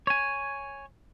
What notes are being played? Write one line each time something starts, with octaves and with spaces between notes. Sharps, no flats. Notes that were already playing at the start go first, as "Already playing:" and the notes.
C#5 G#5